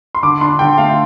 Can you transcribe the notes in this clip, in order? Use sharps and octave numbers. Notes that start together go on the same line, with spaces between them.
C6
D3 D6
D4 C6
D3 G5
A3 F5